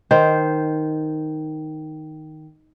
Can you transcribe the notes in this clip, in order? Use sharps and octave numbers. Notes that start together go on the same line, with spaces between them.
D#3 C5